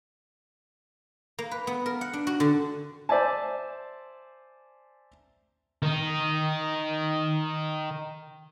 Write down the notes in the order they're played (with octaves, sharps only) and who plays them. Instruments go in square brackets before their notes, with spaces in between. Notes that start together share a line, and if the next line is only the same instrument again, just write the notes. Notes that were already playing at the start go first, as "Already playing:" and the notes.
[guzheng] A#3
B4
B3
A#4
F#5
D4
F#4
D3
[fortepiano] C5 D5 E5 G#5 A5
[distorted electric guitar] D#3 D#4